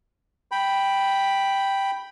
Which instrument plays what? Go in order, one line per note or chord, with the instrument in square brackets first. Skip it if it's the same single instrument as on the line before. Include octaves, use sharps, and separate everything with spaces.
[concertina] G5 B5